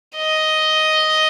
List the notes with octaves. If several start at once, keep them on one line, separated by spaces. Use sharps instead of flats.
D#5